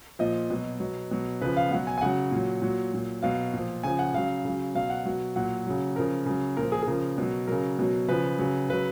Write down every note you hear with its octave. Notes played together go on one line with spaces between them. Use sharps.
A#2 F3 D#5
B2 F#3
B2 F#3
B2 F#3
C#3 F3 B4
F5
B2 F#3 F#5
G#5
G#5
C#3 F#3 F#5
A#2 F#3
A#2 F#3
A#2 F#3
B2 F#3 F5
A#2 F3
C#3 F3 G#5
F#5
C#3 F#3 F5
C#3 F#3
B2 F#3 F5
F#5
B2 F#3
A#2 F#3 F#5
C#3 F#3
C#3 F3 A#4
C#3 F#3
A#2 F3 A#4
G#4
G#4
C#3 F3 A#4
B2 F#3
C#3 F#3 A#4
B2 F#3
C#3 F3 B4
C#3 F#3
C#3 F#3 B4